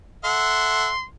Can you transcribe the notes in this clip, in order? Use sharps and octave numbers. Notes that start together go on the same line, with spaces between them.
A4 E5 F#5 C6